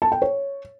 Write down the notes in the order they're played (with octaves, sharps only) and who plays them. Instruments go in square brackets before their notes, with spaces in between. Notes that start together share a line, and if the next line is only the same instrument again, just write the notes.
[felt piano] A5
G5
C#5